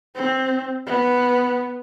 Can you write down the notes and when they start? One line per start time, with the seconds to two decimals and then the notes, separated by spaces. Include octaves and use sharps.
0.15 C4
0.87 B3